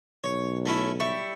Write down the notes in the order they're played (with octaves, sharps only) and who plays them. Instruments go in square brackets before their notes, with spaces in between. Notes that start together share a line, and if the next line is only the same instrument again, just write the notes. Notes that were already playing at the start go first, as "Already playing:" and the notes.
[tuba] B1 [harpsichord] C#5
[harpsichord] A3 C#4 E4
[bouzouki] G3 E4 [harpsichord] C#6